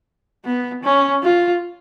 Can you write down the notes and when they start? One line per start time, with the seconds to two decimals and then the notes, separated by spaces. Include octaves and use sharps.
0.45 B3
0.83 C#4
1.23 F4